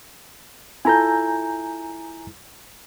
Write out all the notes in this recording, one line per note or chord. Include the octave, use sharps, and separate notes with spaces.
E4 F4 A4 G#5 A#5 G6